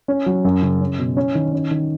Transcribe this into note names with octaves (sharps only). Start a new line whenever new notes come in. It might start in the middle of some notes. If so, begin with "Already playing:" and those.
C#4
F#3
F#2
C#3
C#4
B2
C#4
D#3
C#4
D#3